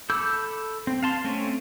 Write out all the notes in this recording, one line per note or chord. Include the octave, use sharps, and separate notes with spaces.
A4 B5 D6 E6 G6
C4
F5 A5 C6
A3 C4 C#4